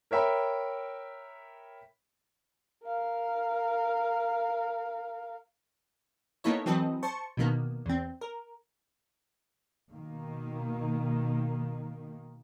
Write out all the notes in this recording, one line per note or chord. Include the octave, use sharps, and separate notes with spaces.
A#4 C#5 E5 G5 B5
A#4 F5
A#3 B3 D#4 E4 A4 C#5
E3 F#3 C4 A4 B4 D#5
C5 A5 C#6
B2 D3 D#3 A#3 B3
E2 C4
A#4
B2 D#3 A#3